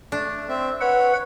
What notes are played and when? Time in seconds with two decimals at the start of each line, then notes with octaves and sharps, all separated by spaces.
0.12 A3 D4
0.48 C4 E5
0.81 B4 C#5 F#5 B5